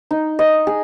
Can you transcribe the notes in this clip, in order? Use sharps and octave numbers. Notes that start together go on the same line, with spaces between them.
D#4
D#5
G#4